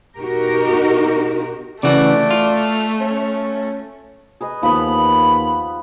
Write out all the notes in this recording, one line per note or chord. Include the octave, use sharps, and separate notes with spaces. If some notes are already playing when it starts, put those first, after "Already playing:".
B2 D#4 F#4 G4 A#4
C#3 E3 A3 F#4 D5
F4
C#4
G#4 B4 D#5
D#2 F3 B3 B5